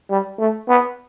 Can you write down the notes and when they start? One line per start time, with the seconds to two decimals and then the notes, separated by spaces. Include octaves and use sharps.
0.10 G3
0.39 A3
0.69 B3